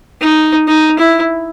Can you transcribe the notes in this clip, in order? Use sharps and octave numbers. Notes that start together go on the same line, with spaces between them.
D#4
D#4
E4